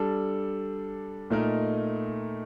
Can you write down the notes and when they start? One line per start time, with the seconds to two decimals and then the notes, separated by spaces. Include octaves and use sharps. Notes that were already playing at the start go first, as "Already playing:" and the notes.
Already playing: G3 D4 A4
1.30 A#2 A3 D#4 A#4 D#5